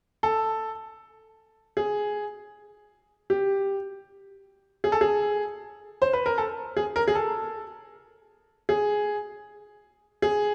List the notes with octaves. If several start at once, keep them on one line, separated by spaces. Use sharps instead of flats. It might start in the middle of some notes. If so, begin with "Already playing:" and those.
A4
G#4
G4
G#4
A4
G#4
C5
B4
A#4
A4
G#4
A#4
G#4
A4
G#4
G#4